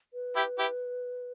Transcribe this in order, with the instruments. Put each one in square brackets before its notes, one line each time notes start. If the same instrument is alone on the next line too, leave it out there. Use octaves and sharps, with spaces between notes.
[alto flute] B4
[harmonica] E4 G4
E4 G4